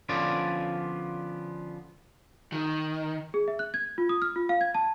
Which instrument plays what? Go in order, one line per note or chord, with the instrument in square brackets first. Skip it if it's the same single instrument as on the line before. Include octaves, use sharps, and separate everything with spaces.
[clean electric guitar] D3 F3 B3 C#4 F4 D5
[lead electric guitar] D#3
[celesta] G#4
E5
F#6
G#6
F4
D#6
F6
F4
F5
G#6
A5